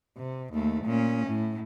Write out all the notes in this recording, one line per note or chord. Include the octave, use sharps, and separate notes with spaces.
C3
D#2 A3
A#2 C#4
A2